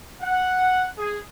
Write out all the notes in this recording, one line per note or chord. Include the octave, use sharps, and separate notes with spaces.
F#5
G#4